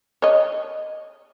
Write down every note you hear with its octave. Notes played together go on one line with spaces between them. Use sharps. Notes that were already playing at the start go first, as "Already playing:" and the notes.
C#5 D#5